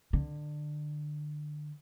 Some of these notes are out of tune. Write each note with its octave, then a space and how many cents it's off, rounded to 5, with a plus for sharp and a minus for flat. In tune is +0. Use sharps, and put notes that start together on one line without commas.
D3 +25